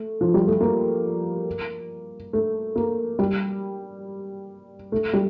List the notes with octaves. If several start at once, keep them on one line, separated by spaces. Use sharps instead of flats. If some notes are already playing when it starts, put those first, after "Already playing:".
Already playing: A3
F3
G3
A3
A#3
A3
A#3
G3
A3
G3